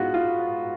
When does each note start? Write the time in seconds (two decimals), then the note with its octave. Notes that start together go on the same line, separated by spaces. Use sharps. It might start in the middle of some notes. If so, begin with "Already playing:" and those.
Already playing: G#2 G#3 B3 F4 F#4
0.14 F4